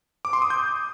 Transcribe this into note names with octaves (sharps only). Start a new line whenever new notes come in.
D6
C6
D#6
G6